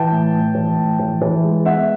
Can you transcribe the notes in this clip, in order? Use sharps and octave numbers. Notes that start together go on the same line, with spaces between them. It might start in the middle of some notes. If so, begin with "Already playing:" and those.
Already playing: E3 G5 A5
A2
A2
E3
A2
E3
E3
G#3
B3 E5 F#5